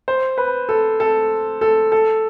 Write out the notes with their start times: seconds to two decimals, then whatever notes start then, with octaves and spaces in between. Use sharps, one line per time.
0.08 C5
0.38 B4
0.69 A4
1.00 A4
1.61 A4
1.92 A4